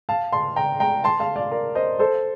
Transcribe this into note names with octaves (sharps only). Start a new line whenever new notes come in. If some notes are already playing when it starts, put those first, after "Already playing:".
F5 A5
A5 C6
G5 A#5
G5 A#5
A5 C6
F5 A5
D5 F5
A#4 D5
C5 D#5
A4 C5